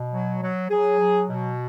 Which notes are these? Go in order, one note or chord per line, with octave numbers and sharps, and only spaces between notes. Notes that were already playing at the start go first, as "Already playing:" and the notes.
Already playing: B2
F#3
F#3
F#3 G#4
F#3
B2